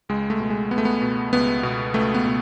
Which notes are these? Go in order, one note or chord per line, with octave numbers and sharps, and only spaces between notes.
C#2 G#3
A3
B2
G#3
C#2 B3
A3
B3
B2
C#2 B3
B2
C#2 A3
B3
B2